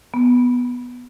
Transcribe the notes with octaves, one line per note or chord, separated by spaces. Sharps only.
B3